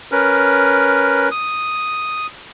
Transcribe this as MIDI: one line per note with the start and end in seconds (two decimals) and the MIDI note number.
0.12 1.29 61
0.12 1.29 70
0.12 1.29 71
1.31 2.27 87